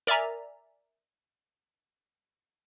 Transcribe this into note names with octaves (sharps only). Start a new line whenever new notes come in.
A#4 D5 E5 G#5 A#5